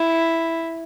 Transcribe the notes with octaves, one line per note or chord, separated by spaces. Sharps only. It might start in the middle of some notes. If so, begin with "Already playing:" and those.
Already playing: E4